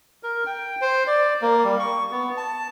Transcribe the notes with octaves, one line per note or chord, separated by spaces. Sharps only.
A#4
G5
C5
D5
A#3
G3
C#6
B3
A5